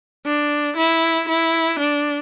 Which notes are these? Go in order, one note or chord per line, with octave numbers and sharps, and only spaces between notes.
D4
E4
E4
D4